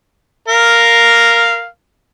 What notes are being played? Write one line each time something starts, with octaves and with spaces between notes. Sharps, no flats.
A#4 F5